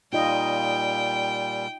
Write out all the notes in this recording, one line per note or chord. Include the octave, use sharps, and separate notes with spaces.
A#2 G3 D#4 F4 D#5 G5